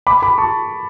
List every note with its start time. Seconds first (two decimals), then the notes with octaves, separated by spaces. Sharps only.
0.07 B5 D6
0.22 B5 D6
0.38 A5 C#6